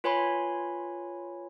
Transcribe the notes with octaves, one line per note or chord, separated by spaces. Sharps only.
F4 B4 C#5 G#5 B5 C6